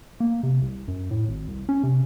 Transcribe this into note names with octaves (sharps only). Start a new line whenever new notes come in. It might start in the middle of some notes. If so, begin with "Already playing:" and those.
A#3
C3
C2
F#2
A2
G#1
C2
C#4
C3